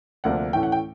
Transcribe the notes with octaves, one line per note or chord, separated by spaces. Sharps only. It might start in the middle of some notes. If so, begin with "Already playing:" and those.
D2 C3 F3 A#3 D4 F#5
A2 E3 A3 C#4 G5
F#5
G5